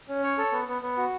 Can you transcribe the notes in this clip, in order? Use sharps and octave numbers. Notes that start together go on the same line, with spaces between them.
C#4
C#5
A4
B3
B3
B3
F#4